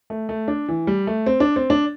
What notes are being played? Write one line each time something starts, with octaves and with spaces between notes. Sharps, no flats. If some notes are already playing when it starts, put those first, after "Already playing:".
A3
A3
D4
E3
G3
A3
C4
D4
C4
D4